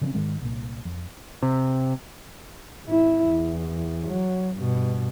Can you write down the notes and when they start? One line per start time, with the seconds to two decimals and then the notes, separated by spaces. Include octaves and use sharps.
0.01 C#3 F3 C4 C#4
0.15 G#2 D#3 G#3
0.41 C2 A#2
0.85 F2
1.42 C3
2.85 G#1 E4
3.25 E2
4.07 F#3
4.57 G2 B2